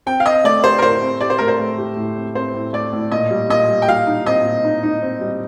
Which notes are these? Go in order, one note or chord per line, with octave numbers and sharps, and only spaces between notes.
C4 G5
F5
C4 D#5
A3 D5
G4 C5
A#4
A2 C5
C4
G4 D5
C5
A3 A#4
C5
A3
G4
A2
C4
C4 C5
A2
A3 D5
A2
A#2 D#5
G3
A#2 D#5
G3
G5
G3 F5
D#4
C4 D#5
A#2
D#4
D#4
C4
G3